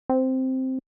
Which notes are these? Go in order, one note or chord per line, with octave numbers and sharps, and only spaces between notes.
C4